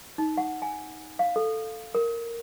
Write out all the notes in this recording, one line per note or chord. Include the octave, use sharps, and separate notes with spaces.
D#4
F#5
G#5
F5
A4
A#4